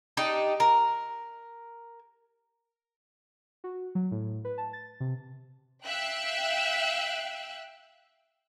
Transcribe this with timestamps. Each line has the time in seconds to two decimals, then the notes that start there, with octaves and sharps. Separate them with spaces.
0.17 D4 D#4 G4
0.60 A#4
3.64 F#4
3.95 F#3
4.11 A2
4.45 B4
4.58 A5
4.73 A6
5.00 C3
5.84 E5 F5 G5 E6 F#6